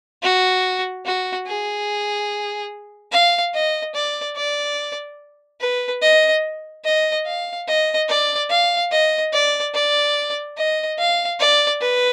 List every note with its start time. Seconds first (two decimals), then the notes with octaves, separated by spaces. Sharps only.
0.23 F#4
1.05 F#4
1.47 G#4
3.12 F5
3.54 D#5
3.95 D5
4.36 D5
5.61 B4
6.02 D#5
6.85 D#5
7.26 F5
7.68 D#5
8.09 D5
8.50 F5
8.91 D#5
9.33 D5
9.74 D5
10.57 D#5
10.98 F5
11.40 D5
11.81 B4